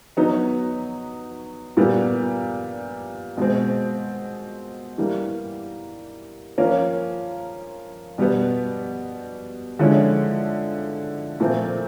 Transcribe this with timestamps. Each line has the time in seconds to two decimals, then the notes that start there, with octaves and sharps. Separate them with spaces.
0.17 F#3 B3 D#4
1.77 A#2 G3 B3
3.37 B2 G#3 C4
4.98 E3 G3 A#3
6.58 F3 A#3 C#4 F4
8.18 B2 G3 B3
9.79 D3 F3 G#3 C#4 E4
11.40 A#2 F3 A3 C4